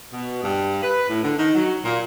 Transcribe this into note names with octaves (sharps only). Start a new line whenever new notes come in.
B2
G2
B4
A2
D3
D#3
F#3
A#2